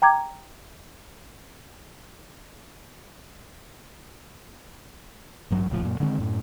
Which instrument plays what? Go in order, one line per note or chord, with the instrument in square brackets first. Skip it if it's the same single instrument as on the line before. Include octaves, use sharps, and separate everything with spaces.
[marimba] G5 A#5 D6 G#6
[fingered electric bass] A1 G2 F#3
D#1 C#2 A2 F3
F#2 A#2
D3 D#3 G#3 C4
F#2 A2